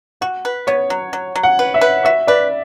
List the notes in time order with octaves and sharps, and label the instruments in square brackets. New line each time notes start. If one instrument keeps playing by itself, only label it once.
[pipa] F#4 [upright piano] F#5
[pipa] B4
[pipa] B3 [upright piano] C#5
[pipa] F#3
F#3
F#3
[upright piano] F#5
[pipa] B4
[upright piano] E5
[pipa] B4
[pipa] F#4 [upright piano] E5
[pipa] B4 [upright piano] D5